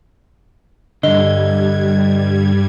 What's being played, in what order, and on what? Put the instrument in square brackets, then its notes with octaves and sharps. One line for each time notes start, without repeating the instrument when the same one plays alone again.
[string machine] G2 G3 G#6 [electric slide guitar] D3 [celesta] D#5 G7